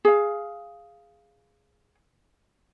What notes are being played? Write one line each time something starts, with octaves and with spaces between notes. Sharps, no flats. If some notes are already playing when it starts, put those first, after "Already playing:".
G#4 F5